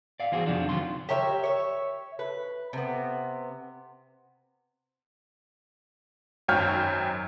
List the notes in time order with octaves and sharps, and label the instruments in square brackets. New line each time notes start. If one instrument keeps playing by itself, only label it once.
[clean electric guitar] D5 F5
E3 F3 C4 F#4 G#4
F2 C3 F3 F#3 D4 F4
C3 D#3 F#3 F4 C6
[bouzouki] G4 A#4 C#5 E5
C#5 E5
B4
C3 B3
[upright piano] G#1 F#2 C#5 G5 F6 G6